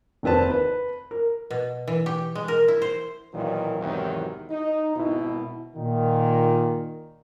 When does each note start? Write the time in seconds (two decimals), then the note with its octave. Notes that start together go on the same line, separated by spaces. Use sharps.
0.23 F1 D#2 C4 B4 A5
0.51 B4
1.11 A#4
1.51 B2
1.88 E3
2.06 G4
2.35 G#3
2.48 A#4
2.68 E4
2.82 C5
3.33 B1 A#2 D#3 E3 F#3
3.80 E2 G#2 C3 D#3 E3 F#3
4.50 D#4
4.95 G#1 B2 E4
5.75 A#2 D#3